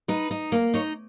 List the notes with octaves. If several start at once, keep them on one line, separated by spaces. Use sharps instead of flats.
D#4 B4
D#4
A#3
D#4 C#5